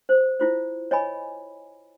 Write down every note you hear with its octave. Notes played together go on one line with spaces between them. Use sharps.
C5
E4 F4 C5
C#5 D#5 G#5 B5